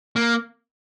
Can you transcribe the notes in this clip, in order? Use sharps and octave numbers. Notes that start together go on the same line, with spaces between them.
A#3